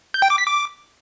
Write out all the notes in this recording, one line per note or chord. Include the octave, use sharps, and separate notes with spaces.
G6
G5
D6
B6
D6